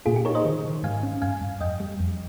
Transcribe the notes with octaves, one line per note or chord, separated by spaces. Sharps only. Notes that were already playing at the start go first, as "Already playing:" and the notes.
A#2 F4 G#4
G4
D#4 A#4 C#5
C5 D#5
D#3
D#3
G#2 F5 G#5
C#4
G2 F5 G#5
G2
F2 D#5 G5
G3
F2